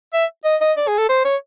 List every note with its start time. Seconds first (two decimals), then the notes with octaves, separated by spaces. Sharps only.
0.14 E5
0.45 D#5
0.61 D#5
0.77 D5
0.88 G#4
0.98 A4
1.09 C5
1.25 C#5